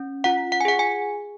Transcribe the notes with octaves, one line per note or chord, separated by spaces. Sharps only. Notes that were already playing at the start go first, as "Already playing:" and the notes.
Already playing: C#4
F4 F#5
F#5
G#5
G#4 F#5
G#5